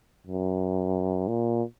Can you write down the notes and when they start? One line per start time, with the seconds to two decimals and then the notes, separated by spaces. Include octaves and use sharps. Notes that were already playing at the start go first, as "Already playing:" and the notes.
0.27 F#2
1.28 A#2